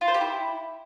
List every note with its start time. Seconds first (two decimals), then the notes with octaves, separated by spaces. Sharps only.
0.01 F4
0.08 C5
0.14 G4
0.21 E4